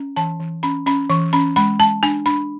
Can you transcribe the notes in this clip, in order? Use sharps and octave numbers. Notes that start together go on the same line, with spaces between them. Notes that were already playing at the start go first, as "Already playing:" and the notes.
Already playing: C#4
E3 A5
E3
C#4 B5
C#4 B5
E3 C#6
C#4 B5
G#3 B5
G#3 A5
D4 G#5
D4 B5